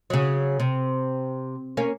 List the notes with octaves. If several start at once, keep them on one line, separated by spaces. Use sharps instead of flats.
C#3 F#3
C3
A#3 C#4